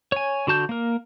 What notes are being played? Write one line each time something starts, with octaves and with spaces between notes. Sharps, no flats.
C#5 G#5
D3 F#4 A5 G6
A#3 A#4